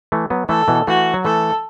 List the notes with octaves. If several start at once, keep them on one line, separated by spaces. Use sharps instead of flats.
E3 A3
F#3 B3
E3 A3 A4
B2 E3
E3 A3 F#4
F#3
E3 A3 A4